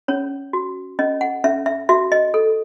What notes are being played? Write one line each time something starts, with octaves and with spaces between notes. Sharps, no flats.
C#4 C#5
F#4
C#4 D#5
F#5
C#4 E5
E5
F#4 E5
D#5
A4